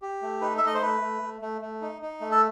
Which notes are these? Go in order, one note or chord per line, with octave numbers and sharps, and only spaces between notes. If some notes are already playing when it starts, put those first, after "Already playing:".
G4
A3
D#4 B4
E5
A3 D#5
C5
A3 B4
A3
A3
A3
A3
D#4
D#4
A3
A4